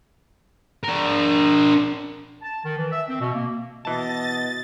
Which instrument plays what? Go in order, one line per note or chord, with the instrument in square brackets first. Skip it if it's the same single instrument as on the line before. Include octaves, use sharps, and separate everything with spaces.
[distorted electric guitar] D4 A#4
[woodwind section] A5
D#3
E3
E5
C4
B2
A#3
[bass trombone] B2 [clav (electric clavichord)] E3 A5 [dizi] D#5 [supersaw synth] A6